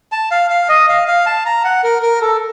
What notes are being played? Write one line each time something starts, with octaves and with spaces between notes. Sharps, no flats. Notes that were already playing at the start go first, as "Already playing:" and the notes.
A5
F5
F5
D#5
F5
F5
A5
A#5
F#5
A#4
A#4
A4